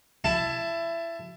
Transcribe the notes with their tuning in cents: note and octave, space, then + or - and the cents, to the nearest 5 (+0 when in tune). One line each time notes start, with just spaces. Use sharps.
E4 +20 A5 +0